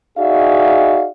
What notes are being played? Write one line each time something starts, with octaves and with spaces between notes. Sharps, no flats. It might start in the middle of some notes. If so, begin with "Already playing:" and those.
D#4 F#4 G#4 D5 E5 F5